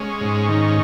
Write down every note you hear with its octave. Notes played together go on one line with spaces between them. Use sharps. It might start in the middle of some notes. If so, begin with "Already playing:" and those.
Already playing: G#3 C#4
G#2
D#3